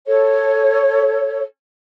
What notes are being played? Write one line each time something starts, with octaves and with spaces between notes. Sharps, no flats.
A4 C#5